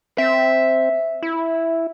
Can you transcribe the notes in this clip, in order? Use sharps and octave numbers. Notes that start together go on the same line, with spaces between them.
C4 E5
E4